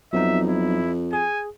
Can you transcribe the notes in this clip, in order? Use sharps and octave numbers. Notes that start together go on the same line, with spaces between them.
F2 F#3 B3 D#4 E5
E4
G#4 G#5